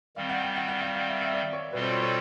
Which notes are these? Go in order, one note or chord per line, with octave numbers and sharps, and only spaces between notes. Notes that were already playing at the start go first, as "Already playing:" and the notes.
D#3 G3 C4 F5
F#5
G5
F#5
F#5
F5
F5
E5
E5
D5
C#5
B2 G3 C4 F4 A4 B4
C5
C#5
C#5